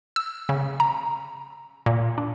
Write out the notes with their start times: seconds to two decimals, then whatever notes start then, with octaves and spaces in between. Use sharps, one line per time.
0.16 E6
0.49 C#3
0.80 A#5
1.86 A#2
2.18 D4